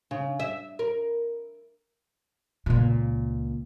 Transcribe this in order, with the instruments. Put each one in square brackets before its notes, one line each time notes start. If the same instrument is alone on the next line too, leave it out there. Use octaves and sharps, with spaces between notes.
[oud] C#3
E5
A#4
[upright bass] C#2 A#2